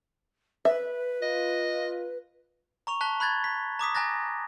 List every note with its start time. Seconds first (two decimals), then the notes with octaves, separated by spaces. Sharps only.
0.65 B4 E5
1.22 F4 D#5
2.87 A#5 C#6 F7
3.01 A5 F#6 B6 G7
3.20 B5 F#6 G#6 A6
3.44 B6
3.79 A#5 D6 D#6 B6
3.95 G#5 A#5 F#6 A6 A#6